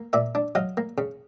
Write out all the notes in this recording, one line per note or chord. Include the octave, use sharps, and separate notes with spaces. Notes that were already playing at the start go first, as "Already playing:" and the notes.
Already playing: A#3
A#2 D5 E5
D4
F#3 D#5 F5
A#3
C#3